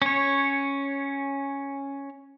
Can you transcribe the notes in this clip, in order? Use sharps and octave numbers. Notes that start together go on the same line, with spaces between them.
C#4 C#5